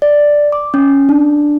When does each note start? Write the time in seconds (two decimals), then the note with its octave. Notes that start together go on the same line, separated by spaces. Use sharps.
0.02 D5
0.52 D6
0.74 C#4
1.09 D4